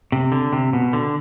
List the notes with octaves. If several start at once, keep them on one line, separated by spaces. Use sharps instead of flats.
C3
D3
C3
B2
D3